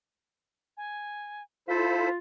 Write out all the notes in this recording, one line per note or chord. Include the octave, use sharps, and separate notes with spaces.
G#5
E4 F4 A4 C5 B6